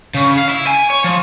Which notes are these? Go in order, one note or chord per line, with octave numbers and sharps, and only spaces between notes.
C#3
F5
E4
G#5
C#5
F3